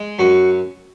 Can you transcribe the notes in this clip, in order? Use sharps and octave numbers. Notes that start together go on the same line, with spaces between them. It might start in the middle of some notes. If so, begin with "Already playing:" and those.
Already playing: G#3
F#2 F#4